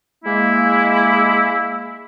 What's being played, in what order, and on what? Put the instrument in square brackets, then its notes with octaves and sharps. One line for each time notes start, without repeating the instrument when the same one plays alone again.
[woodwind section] G#3 A#3 E4